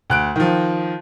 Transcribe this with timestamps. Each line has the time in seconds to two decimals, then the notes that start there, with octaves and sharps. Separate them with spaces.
0.10 D2 F#6 D7
0.36 D#3 F3